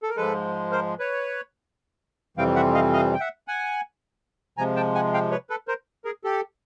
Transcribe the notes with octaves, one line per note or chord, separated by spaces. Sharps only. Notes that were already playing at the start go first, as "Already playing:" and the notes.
A4
A#4
G#2 F3 G#3 A4 B4
A#4 C5
B4 C#5
F2 C3 E3 G3 C4 F5 G5
E5 F#5
D#5 F5
D#5 F5
G5
E5 F#5
F#5 G#5
C3 F3 G#3 G#5 A#5
G5 A5
F#5 G#5
F5 G5
B4 C#5
A4 B4
A#4 C5
G#4 A#4
G4 A4